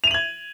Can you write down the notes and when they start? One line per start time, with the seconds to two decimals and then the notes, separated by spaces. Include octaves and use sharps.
0.04 F7
0.07 D#7
0.11 F#7
0.14 G#6